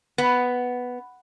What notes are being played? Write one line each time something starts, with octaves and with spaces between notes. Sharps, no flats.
B3